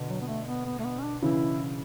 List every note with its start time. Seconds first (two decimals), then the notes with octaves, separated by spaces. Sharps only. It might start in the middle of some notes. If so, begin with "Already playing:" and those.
Already playing: B2 D3
0.09 F#3
0.21 B3
0.27 A3
0.47 B3
0.65 B3
0.79 A3
0.84 B3
0.99 C#4
1.03 D4
1.22 C#3 E3 E4